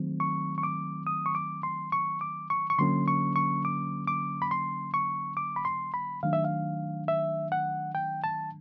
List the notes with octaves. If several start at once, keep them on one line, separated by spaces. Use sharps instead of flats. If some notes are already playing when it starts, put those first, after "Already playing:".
Already playing: D#3 F#3 A3 C4
C#6
C#6
D6
D#6
C#6
D6
C6
C#6
D6
C#6
C#6
D3 F#3 A#3 C#4 C6
C#6
C#6
D6
D6
B5
C6
C#6
D6
B5
C6
B5
D#3 F#3 A3 D4 F5
E5
F5
E5
F#5
G5
A5